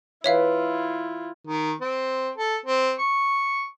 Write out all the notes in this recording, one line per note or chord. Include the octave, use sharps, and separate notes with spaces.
E3 E4 F4 B4 C#5 E5 F5 B5
D#3
C4
A4
C4
C#6